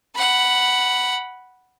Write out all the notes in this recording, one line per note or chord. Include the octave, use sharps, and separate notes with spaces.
F#5 B5